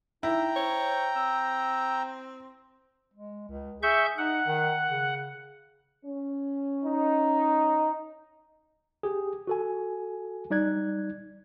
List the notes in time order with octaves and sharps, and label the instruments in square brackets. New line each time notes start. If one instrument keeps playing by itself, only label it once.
[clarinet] D#4 [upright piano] E4 [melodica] G5 A#5
[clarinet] C5 [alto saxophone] C#5
[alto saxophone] C4 [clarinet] E6
[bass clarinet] G#3
C#2
[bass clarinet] G#4 [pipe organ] E5 C#6 G6
[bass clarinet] D#4 [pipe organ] F#5
[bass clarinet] D#3
C#3
[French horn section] C#4
[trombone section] D#4
[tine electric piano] G4 G#4
F#4 A4 G#5
G3 D#4 D5 F#6 G#6